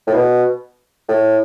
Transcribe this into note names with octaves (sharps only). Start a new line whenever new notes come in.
A2
B2
A2